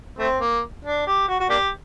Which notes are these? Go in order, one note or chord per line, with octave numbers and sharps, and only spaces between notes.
A3 C4
A#3
D4
G4
F#4
F#4
A#3 D4 G4